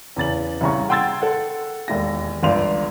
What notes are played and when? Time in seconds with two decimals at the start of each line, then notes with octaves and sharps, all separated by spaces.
0.16 E2 C#3 A6 F#7
0.61 C2 C#3 A#5 C#6
0.89 F#5 G5 C6 E6 G#6 A6
1.22 A4 F#5
1.88 E1 D#2 A#6
2.43 G1 C#2 D5 C6 F7